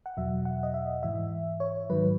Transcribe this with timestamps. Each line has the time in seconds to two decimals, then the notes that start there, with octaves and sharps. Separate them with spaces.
0.06 F#5
0.17 E2 B2 F#3 E5
0.45 F#5
0.63 D#5
0.74 E5
1.03 G#2 E3 E5
1.60 C#5
1.90 G#2 D#3 F#3 B4